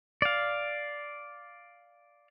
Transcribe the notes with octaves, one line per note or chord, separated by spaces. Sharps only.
D5 F5